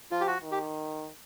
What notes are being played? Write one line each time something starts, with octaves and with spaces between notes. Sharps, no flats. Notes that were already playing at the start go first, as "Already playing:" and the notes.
F3 F4
G4
F#4
D#3
G4